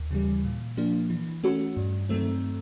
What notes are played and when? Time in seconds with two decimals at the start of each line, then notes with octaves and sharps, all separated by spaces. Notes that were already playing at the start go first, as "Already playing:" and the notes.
Already playing: D#2
0.11 C#3 E3 G3
0.45 A#2
0.77 F3 A#3 D4
1.10 E3
1.44 A3 C#4 F#4
1.77 G2
2.09 D#3 F#3 A3 C4